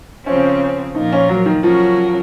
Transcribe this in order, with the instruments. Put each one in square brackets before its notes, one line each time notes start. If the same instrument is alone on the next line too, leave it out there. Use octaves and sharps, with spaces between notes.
[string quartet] C#3 F3 C4 [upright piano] C#4
[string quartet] A#2 F3 A#3 F4 A#4 [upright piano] D#4
[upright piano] C#4
F#3
D#3
[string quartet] C#3 F#3 C#4 F#4 A#4 [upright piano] F3